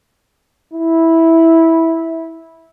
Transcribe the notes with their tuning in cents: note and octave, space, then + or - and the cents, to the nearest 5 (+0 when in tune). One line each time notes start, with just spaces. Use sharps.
E4 -10